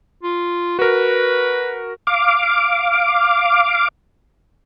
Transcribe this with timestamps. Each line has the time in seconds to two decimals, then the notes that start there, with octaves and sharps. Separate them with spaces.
0.23 F4
0.79 F#4 A#4 B4
2.07 F5 D6